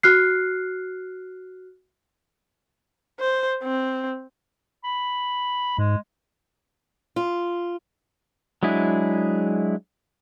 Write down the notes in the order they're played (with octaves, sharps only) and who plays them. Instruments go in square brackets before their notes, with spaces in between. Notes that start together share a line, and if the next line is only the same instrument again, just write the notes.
[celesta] F#4 F6 F#6 C7
[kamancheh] C5
C4
[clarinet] B5
[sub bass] G#2 [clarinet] G#3
[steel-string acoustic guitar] F4
[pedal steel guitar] F#3 G#3 D4 E4 G#4